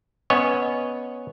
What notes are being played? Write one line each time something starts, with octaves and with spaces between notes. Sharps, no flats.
B3 C#4 C#5 D#5